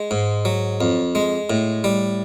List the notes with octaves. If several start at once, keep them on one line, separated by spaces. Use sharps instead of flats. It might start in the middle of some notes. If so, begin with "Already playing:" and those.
Already playing: G#3
G#2
F#3
F2
G#3
A2
G3